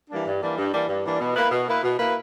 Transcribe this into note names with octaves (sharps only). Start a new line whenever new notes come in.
E3 G3 A#3 D4
G2
E3 G3 A#3 D4
G2
E3 G3 A#3 D4
G2
E3 G3 A#3 D4
B2
A#3 E4 B4
B2
A#3 E4 B4
B2
A#3 E4 B4